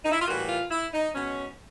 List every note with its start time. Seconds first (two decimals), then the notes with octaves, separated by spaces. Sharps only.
0.05 D#4
0.12 E4
0.21 F4
0.27 A2 E3 G3 A#3 F#4
0.49 F4
0.71 E4
0.94 D#4
1.15 B2 G#3 C#4